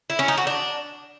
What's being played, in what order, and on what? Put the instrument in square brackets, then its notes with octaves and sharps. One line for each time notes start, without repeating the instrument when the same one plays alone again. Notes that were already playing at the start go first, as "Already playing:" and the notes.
[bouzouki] E4
C#4
D#4
F#4
D4